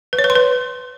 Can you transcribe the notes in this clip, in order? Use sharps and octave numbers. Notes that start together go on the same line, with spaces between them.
B4
C#5
B4
C6
B4